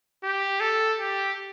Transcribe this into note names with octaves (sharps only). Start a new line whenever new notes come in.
G4
A4
G4